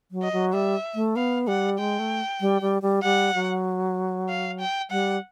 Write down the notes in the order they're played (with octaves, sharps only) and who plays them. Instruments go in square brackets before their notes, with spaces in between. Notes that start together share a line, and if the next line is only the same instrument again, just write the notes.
[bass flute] F#3
[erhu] D#5
[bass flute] F#3
[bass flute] G3 [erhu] E5
[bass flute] A3
[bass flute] B3 [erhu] F5
[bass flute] G3 [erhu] F#5
[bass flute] G#3 [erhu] G5
[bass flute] A3
G3
G3
G3
[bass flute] G3 [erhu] F#5
[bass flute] F#3
[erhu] F5
G5
[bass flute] G3 [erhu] F#5